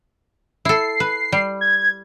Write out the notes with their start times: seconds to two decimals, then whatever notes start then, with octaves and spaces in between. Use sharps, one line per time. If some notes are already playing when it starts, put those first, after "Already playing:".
0.65 E4 A4 C7
1.00 B4
1.32 G3
1.61 G#6